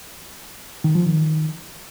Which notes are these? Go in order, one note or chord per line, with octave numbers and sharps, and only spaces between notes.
D#3
F3
D#3